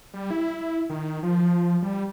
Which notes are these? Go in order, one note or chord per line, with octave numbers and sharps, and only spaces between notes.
G3
E4
D#3
F3
G3